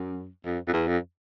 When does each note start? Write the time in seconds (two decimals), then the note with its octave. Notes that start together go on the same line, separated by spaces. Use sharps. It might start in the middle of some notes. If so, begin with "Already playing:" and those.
Already playing: F#2
0.45 F2
0.67 F2
0.73 E2
0.87 F2